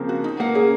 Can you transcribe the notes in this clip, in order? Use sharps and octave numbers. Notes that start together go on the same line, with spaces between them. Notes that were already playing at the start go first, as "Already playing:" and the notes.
Already playing: C#3 F3 A#3 C4
F#4
D#4
A#3 F#5
C#4 G#4